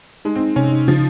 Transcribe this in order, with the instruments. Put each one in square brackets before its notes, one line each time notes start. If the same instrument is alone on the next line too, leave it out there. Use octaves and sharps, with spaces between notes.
[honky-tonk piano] G#3 [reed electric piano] D#4
[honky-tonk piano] C4
[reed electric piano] D#4
[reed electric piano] C3 [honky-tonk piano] C#4
[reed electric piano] D#4
[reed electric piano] C#3 [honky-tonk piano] F3